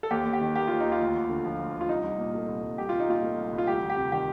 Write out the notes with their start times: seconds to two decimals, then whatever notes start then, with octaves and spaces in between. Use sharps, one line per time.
0.03 A4
0.11 D#2 G4
0.25 D#2
0.33 G4
0.41 D#3
0.56 A#3 G4
0.68 D#2 F4
0.80 D#4
0.86 D#2
0.92 F4
1.00 D2
1.14 D2
1.29 D3
1.45 F3
1.59 D2
1.74 D2
1.81 F4
1.89 C2 D#4
2.04 C2
2.18 A#2
2.34 A3
2.48 C2
2.63 C2
2.78 C2 G4
2.89 C2 F4
3.00 D#4
3.08 A#2 F4
3.23 A3
3.38 C2
3.53 C2
3.58 F4
3.67 D2 G4
3.82 D2
3.90 G4
3.97 C3
4.12 D#3 G4